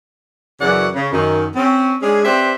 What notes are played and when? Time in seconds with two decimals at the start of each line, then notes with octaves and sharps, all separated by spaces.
0.61 F#2 C#3 E3 F#3 D5 F#5
0.95 C#3
1.12 F#2 D#3
1.55 C4 C#4
2.02 G#3 C#4 D4 G#4
2.25 C4 G4 B4 C5 D5 E5